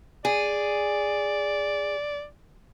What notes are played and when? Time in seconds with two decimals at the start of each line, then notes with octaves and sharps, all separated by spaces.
0.25 G#4 D5